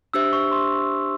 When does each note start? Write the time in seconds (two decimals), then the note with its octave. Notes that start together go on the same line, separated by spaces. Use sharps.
0.14 D4 G4 C5 E5 E6
0.33 C#6
0.52 C6